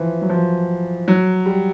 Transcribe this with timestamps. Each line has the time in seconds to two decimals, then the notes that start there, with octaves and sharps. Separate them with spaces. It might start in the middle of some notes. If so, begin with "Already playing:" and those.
Already playing: E3 F3
0.22 F#3
0.30 F3
1.08 F#3
1.46 G3